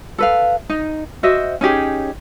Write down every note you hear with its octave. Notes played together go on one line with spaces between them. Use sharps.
A4 B4 F5
D#4
F#4 C5 D#5 E5
C#4 D#4 G4 G#4